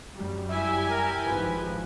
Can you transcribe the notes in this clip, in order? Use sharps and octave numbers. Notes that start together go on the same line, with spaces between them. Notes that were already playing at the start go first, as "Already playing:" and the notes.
F#2 G3
E4 G4 E5 G#5
A#4
G#1 F3 B4